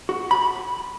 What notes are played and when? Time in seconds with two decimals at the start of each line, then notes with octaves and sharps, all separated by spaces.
0.09 F#4
0.31 B5